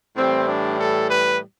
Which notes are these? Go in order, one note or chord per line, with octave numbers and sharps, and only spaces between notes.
A2 E3 G3 C4
D4
A4
B4